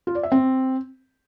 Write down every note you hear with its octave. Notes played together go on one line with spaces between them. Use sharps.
F4
D5
E5
C4